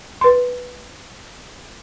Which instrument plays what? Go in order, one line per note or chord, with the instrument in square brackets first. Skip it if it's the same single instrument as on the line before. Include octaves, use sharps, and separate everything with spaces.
[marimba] B4 C6